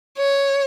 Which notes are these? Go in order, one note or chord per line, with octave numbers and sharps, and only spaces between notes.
C#5